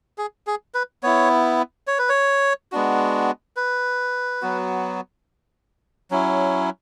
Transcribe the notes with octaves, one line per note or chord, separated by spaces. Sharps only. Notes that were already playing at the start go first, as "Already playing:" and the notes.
G#4
G#4
B4
B3 E4 C#5
C#5
B4
C#5
G#3 B3 D4 F#4
B4
F#3 B3 F#4
F#3 C#4 E4